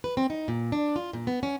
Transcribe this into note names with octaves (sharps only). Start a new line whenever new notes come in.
B4
C4
D#4
A#2
D4
F4
A#2
B3
C#4